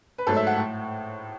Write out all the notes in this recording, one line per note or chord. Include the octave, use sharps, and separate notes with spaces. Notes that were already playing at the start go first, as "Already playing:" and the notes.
B4
G#2 F#3 A3 A4
E5
F#5
A2